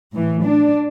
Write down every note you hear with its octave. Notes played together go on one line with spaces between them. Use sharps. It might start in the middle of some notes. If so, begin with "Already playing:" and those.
A2 E3
D4